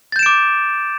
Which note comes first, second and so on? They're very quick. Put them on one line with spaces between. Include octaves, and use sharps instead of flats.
A6 G6 E7 D7 D6